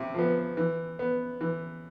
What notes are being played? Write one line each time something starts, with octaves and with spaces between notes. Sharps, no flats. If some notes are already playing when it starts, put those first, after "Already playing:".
Already playing: C3 E4
F3 B3
E3
B3
E3